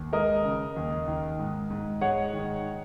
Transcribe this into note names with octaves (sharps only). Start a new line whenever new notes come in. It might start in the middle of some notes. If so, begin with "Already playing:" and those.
Already playing: D#2
G#3 A#4 D#5
C#3
D#2
D#3
G#2
G#2
G#3 C#5 F#5
D#3